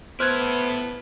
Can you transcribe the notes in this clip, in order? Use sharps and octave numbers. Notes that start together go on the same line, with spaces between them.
B3 E4 A4 C5 F6 F#6 G#6